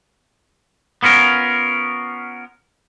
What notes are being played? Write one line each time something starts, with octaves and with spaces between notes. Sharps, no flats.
B3 C#4 F4 A#4